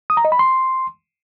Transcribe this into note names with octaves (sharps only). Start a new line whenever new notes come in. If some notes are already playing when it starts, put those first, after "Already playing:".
D#6
A#5
D#5
B5
C6